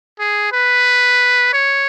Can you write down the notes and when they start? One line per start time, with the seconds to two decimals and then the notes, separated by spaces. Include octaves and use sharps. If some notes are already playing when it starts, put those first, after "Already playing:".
0.20 G#4
0.53 B4
1.54 C#5